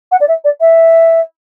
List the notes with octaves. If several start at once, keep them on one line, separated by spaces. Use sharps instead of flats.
F#5
D5
E5
D5
E5